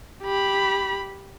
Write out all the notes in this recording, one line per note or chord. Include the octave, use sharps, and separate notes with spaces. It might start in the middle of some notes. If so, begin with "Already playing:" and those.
G4 B5